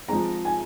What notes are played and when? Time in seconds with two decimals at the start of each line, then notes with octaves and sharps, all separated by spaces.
0.08 F3 G#3 C4 A#5
0.45 G#5